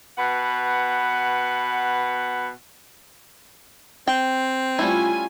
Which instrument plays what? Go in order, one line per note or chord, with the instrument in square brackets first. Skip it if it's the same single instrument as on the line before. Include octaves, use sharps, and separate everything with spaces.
[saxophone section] B2 B4 F#5
[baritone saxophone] C4 [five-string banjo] G5
[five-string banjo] G3 A3 E4 [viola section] C#4 F4 G#5